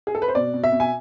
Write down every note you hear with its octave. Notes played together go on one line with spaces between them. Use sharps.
G#4
A4
B4
C5
B2 D5
B2
E5
B2
G#5